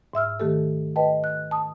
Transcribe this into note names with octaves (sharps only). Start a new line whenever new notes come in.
G#2 E5 E6 F6
D#3 A3 G4 A4
B4 D#5 G5 A5
F#6
A5 D#6